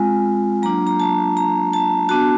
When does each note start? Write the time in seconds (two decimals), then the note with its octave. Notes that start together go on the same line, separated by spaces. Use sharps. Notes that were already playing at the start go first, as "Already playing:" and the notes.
Already playing: G#3 C4 F4 G#5
0.62 F#3 A#3 D4 F4 A#5
0.87 A#5
1.00 A5
1.37 A#5
1.73 A5
2.09 B3 D4 F#4 A5